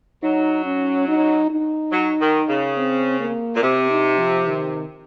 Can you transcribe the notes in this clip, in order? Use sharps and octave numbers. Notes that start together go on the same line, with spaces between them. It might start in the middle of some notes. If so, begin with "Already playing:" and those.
F#3 D#4
C#4
D#4
D#4
F#3
D#3
C#3
C4
A#3
A#2
C3 C4
D#4
F3
D#3